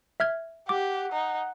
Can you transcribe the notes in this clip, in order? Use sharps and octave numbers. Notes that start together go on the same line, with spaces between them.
E5 F6 G#6
G4 F#5 D6
D#4